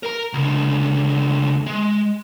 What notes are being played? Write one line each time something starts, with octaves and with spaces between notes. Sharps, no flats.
A#4 A#5
C#2 D3
G#3